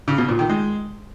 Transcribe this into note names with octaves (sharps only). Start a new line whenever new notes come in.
C#3
B2
A#2
D#3
G#3